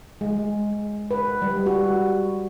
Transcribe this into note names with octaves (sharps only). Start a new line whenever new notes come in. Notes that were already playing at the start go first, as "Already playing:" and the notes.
G#3
B4
G3
F#4